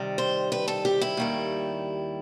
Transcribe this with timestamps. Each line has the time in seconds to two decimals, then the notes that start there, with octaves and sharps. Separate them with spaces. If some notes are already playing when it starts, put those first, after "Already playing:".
Already playing: C3 D#3 G3
0.18 C5
0.52 B4
0.68 A4
0.85 G4
1.01 E4
1.17 D#2 D#3 G3